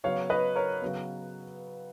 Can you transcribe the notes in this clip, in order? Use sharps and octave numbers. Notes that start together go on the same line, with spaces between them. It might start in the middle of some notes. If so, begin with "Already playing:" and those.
C#3 F#3 B3 C#5 F5
B4 D#5
A#4 C#5
C#3 F#3 B3